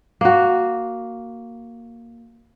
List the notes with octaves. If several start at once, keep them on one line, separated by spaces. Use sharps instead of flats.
A#3 F#4